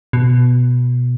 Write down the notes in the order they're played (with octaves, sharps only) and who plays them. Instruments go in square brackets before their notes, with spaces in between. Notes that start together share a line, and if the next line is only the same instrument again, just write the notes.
[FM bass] B2